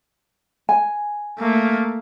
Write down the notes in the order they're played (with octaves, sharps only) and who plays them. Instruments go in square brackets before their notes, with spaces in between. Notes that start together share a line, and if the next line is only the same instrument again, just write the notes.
[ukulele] G#5
[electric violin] A3 A#3